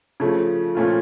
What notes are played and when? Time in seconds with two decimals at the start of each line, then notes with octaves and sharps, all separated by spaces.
0.20 C#3 F3 A3
0.75 A#2 F3 A3 C#4 F4